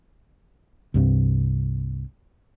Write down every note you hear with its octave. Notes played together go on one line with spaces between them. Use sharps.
C2 G2 C3